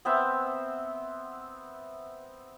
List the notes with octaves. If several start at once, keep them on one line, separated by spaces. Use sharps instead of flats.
B3 C4 E5 F#5